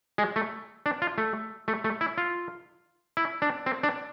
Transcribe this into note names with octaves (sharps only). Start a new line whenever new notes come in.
G#3
A3
D4
F4
A3
A3
A3
E4
F4
E4
D4
C4
D4